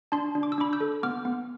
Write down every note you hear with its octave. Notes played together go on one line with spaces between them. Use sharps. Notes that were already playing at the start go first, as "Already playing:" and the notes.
D4 A5 C6
D4
D6
E6
D4 B5 D6
E6 G6
A4
B3 D6 F6
B3